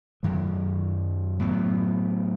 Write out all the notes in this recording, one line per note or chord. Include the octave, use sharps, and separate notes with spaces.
F#2 D#3 F#3
A2 F#3 B3